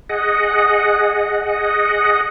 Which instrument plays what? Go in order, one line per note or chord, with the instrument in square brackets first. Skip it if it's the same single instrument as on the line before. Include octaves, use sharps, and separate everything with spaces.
[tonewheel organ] G#4 D#5 F#5